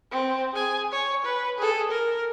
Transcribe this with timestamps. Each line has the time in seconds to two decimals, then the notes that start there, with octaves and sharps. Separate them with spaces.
0.11 C4
0.53 G#4 G#5
0.92 C#5
1.25 B4
1.58 G#4 A4
1.91 A#4